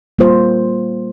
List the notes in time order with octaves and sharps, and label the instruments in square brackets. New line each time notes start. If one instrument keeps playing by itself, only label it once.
[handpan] G3 A#3 F4 C5